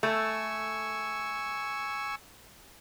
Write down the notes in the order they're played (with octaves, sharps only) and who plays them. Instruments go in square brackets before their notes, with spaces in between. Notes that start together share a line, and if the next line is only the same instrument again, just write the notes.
[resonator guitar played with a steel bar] A3 [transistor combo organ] G#5 C#6 E6